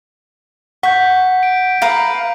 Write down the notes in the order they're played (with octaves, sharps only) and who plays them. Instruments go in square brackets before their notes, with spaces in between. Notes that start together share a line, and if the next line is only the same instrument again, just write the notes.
[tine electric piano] F#5 [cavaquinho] C#6 [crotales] G6 B6
[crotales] D7
[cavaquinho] B4 F5 A#5